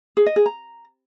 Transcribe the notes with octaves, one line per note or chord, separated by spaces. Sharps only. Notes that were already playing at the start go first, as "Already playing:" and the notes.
G#4
D#5
G#4
A#5